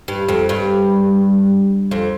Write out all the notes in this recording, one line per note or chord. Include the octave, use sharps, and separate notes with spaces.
G2
F2
G2
F2